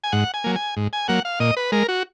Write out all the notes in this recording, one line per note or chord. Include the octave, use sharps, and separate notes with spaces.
G#5
G#2 F#5
G#5
F#3 A#3
G#5
G#2
G#5
F#3 A#3 F#5
F5
A#2 D#5
B4
G#3 A#4
F#4